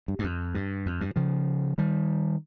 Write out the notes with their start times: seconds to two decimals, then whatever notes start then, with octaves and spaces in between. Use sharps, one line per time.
0.08 G2
0.19 G2
0.24 F2
0.54 G2
0.86 F2
1.01 G2
1.16 C#3 F3
1.78 D#3 G3